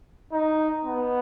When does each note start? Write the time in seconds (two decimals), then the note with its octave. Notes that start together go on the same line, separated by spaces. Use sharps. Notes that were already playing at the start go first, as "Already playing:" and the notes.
0.32 D#4
0.85 B3